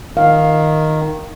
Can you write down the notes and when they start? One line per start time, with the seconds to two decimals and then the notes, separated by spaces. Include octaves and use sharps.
0.17 D#3 F5